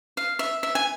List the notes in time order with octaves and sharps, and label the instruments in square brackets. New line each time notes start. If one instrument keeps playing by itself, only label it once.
[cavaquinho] F5
E5
E5
G#5